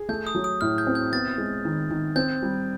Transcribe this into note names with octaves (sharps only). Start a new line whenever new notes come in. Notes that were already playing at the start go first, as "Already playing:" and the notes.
Already playing: G#4
A3 G6
D#6
F#3
D#6
A2 F6
G6
C4
G6
B3 A6
G#3
D#3
D#3
C4 G6
G3